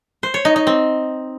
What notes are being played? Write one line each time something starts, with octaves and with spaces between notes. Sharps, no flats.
C5
C#5
D#4
D#4
C4